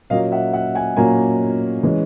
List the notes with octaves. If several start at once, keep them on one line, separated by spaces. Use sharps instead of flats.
A#2 F#3 A#3 C#4 D#5 F5
E5 F#5
E5 F#5
F#5 G#5
A#2 F#3 A#3 C#4 G#5 A#5
E3 G#3 C#4